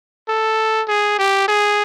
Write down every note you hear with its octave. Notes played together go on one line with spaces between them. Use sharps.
A4
G#4
G4
G#4